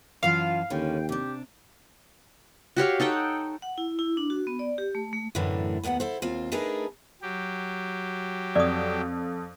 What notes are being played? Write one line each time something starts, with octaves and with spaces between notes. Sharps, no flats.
F#2 E3 F4 F5 A5
D#2 D3 C#4 B4 G5
C3 D4 G4
F#4 G4 C#5 F5
D#4 A4 F#5 G5
F#5
E4
E4
D4
F#4
B3
D5
G4
A3
A3
F#2 A2 D3 E3 A3 D4
D#2 A2 B3 D5 F#5
E4 A4 C5
D#2 C4 F4
A3 D4 D#4 G#4 A#4 B4
F#3 G4
F2 D5 D#6